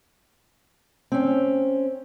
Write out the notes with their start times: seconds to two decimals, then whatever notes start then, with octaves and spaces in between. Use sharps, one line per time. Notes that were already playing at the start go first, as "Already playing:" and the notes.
1.12 C4 C#4